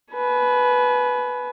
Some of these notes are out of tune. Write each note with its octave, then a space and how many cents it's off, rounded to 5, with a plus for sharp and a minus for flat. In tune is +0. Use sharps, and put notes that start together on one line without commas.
B4 +0 G#5 +45